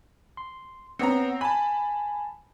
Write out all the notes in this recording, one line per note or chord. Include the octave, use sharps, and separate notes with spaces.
C6
B3 C4 C#5 A#5 C#7
G#5 A5 B5